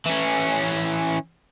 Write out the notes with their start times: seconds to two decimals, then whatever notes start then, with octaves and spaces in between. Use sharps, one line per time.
0.06 E3 C#4